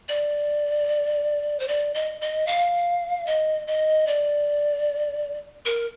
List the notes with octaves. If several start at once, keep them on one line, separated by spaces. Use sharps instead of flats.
D5
C5
D5
D#5
D#5
F5
D#5
D#5
D5
A#4